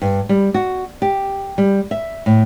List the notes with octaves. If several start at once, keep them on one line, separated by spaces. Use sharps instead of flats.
G2
G3
F#4
G4
G3
E5
A2